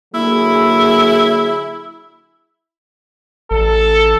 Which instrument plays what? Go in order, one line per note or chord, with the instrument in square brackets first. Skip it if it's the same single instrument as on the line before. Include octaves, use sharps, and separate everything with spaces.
[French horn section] D3 F#3 G#4 [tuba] A#3 [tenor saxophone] E4
[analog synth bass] A1 [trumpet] A4